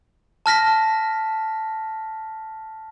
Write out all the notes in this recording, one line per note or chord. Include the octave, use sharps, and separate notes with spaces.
A5 F6 A#6 B6